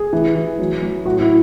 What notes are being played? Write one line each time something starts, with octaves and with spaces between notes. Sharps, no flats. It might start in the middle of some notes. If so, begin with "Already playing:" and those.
Already playing: G#4
E3
E3
F#3
F#3
A2 F#4
E4